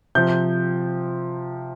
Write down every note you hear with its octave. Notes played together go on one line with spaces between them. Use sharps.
C3 F3 G6